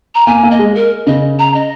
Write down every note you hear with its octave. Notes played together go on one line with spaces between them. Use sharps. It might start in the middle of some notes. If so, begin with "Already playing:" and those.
A#5
A#3 G#5
A#3
D#5
G#3
A#4
C#3 D#5
A#5
D#5